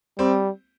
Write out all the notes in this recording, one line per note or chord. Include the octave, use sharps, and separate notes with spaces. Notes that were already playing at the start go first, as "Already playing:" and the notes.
G3 C4